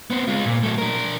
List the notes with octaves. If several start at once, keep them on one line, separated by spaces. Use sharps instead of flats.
B3 C4
G#3 F4
A#2
F#3 A3
D4 A#4